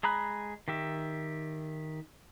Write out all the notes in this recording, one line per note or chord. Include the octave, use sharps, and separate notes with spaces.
G#3 G#4 A#5 B5 F#6
D#3 G4 E5